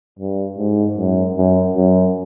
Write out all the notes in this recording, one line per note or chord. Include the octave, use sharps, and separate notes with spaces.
G2
G#2
F#2
F#2
F#2